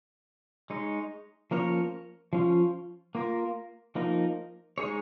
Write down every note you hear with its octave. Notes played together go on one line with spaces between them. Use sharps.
G#3 D#4 C#5
F3 A#3 C#4 A#4 C#5
F3 C#4 F4
A#3 F4 A#4
F3 A#3 D#4 A#4
G#3 D#4 G#4 C#5